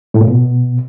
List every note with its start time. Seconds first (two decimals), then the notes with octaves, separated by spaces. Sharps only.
0.14 A2
0.21 A#2
0.27 B2